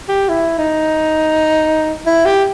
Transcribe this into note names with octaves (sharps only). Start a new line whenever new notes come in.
G4
E4
D#4
E4
G4